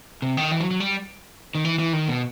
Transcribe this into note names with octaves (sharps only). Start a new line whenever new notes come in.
C3
D#3
E3
F#3
F#3
G3
D#3
E3
E3
D#3
B2